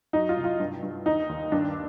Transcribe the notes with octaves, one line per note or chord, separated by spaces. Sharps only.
F#3 D#4
F4
C2
F4
G2
G2
D#2 D#4
D#2
G2 D4